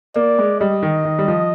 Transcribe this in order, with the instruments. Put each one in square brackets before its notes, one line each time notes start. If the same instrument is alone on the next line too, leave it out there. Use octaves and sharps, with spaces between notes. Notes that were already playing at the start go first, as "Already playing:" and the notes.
[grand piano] A#3 [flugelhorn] D5
[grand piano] G#3
[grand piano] G3 [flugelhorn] D#5
[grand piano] D#3
D#3
G3
F3